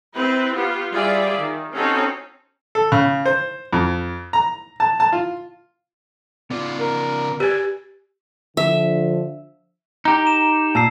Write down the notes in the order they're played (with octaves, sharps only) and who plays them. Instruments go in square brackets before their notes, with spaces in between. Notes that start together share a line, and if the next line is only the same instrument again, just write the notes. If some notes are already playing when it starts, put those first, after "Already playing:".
[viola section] C4 E4 B4
B3 F4 G4
G3 F4 G#4 D5 E5
D#3
C4 C#4 D#4 F#4 A4 C#5
[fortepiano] A4
C#3
C5
F2
A#5
A5
A5
F4
[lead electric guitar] C#3 D5 [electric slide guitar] B3 F4
[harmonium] A#4
[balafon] G4 [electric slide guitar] B4 D5 G#5
[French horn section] D3 F3 [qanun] E5
[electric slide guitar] D#4 G4 [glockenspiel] A#5
[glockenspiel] E7
[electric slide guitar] A#2 [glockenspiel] A5 E6 C7